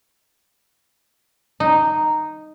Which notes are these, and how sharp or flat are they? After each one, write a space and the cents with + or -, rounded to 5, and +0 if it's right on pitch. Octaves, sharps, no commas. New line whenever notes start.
D#4 -5